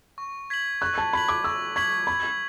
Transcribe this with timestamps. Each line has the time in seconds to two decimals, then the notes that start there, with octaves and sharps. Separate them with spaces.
0.18 C#6
0.50 G#6 B6 F#7
0.81 C#6 F#6
0.98 A5
1.13 B5 G#6 B6 F#7
1.29 D6
1.44 C#6 E6
1.76 C#6 G#6 B6 F#7
2.07 B5 G#6